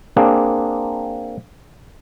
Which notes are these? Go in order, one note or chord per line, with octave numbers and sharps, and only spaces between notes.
A#3 C4 D4 G#4